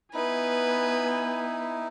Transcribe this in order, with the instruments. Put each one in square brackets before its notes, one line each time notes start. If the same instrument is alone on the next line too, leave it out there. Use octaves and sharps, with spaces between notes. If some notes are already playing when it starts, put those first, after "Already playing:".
[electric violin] B3 G#5 [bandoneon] D#4 E4 [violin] B4